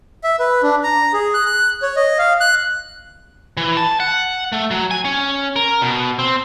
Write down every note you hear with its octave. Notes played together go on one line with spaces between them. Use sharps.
E5
B4
D4
A#5
G#4
F#6
F#6
C#5
D#5
F5
F#6
E3
A5
F#5
A3
F#3
G#5
C#4
A#4
B2
C4